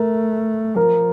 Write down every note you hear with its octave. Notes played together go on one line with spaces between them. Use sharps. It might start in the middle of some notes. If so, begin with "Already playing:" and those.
Already playing: A3 A#4
F3 A#4